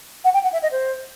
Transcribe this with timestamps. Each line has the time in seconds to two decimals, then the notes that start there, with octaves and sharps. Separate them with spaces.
0.24 F#5
0.34 G5
0.43 F#5
0.53 E5
0.63 D#5
0.72 C5